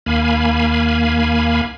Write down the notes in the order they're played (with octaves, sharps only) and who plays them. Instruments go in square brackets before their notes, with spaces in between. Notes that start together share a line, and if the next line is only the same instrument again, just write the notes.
[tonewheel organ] D#2 A#3 F5 G#5 B5